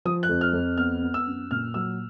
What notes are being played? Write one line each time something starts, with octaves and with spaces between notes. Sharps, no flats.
F3 D#6
F#6
F2
F6
F2
B3 F6
B3
E6
F#2
A#2 F6
F#3 E6